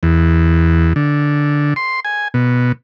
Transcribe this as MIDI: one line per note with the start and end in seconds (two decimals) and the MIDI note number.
0.03 0.93 40
0.96 1.74 50
1.76 2.00 84
2.05 2.28 80
2.34 2.72 47